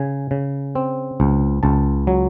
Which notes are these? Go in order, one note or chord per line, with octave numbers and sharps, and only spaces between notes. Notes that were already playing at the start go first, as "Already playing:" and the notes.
Already playing: C#3 G#5
C#3
C4
C#2
C#2 A5
F#3